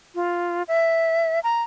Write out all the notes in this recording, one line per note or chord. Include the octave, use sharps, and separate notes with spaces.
F4
E5
A#5